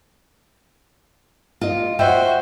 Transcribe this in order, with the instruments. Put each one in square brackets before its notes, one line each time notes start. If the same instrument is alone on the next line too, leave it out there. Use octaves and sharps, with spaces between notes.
[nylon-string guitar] F4 D#5
[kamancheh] F#4 C5 [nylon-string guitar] C#5 E5 G5